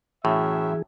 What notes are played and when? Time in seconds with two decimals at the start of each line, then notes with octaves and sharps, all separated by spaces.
0.25 F#2 A2 E3 G#4 E5